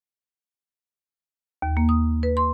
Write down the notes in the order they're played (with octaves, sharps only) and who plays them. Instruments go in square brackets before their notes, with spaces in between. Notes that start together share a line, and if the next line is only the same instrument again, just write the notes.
[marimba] D#2
A#3
D#6
B4
C6